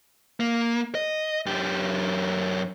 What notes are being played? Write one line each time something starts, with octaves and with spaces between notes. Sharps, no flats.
A#3
D#5
F#2 G4